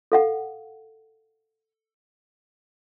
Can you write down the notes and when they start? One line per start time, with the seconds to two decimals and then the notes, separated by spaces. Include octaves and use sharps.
0.12 A4 F5 F#5